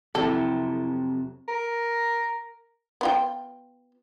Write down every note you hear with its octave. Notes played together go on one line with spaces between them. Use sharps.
F2 C3 F#3 E4 G4 A4 B4
A#4
B3 F4 G5